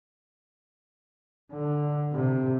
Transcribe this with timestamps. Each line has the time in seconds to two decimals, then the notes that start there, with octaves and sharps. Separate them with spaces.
1.51 D3
2.13 C3